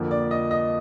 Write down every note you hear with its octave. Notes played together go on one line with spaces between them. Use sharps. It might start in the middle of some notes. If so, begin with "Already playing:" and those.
Already playing: F2 D3 F3 A#3
D5
D#5
D#5